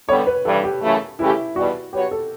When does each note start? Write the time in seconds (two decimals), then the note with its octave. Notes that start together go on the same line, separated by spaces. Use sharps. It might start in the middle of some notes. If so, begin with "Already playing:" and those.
0.09 D3 G3 B3 C#5
0.27 B4
0.45 G2 E3 G3 A4
0.64 G4
0.82 F#2 C#3 E3 A3
1.19 C#3 E3 A3 C#4 E4 G4
1.56 E2 B2 G3 F#4
1.92 F#3 B3 F#4 G4 C#5
2.11 A4